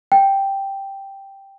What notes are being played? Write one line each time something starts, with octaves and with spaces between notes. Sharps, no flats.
G5